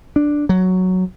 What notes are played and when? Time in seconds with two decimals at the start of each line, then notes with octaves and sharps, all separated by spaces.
0.16 D4
0.49 F#3